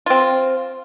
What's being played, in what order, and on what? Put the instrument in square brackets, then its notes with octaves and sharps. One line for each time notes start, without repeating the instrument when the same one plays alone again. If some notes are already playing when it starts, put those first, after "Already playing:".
[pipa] C4 F4